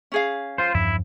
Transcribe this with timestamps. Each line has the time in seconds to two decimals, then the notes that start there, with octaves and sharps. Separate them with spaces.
0.12 C#4 G#4 F5
0.58 F4 C5
0.75 E2 G2 F3 E4